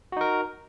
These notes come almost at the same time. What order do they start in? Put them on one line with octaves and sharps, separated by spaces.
F#4 D#4 A#4